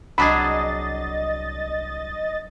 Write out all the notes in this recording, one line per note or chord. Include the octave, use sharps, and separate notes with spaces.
C2 F#3 D4 G#4 D#5 B5 A6